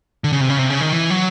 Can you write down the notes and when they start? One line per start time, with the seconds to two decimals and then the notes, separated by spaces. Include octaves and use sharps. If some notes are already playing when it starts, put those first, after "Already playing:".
0.24 D3
0.32 C#3
0.41 C3
0.50 C#3
0.58 C3
0.70 C#3
0.80 D#3
0.93 E3
1.10 F#3